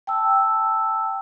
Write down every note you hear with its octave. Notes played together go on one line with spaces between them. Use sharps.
G5 A5 E6